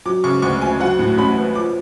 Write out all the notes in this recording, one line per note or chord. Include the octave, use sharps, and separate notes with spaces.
F#3 D6
C#3 C#6
D2 C#6
D2 G#5
F#3 F#5
A2
A1 B5
B3
F3 D6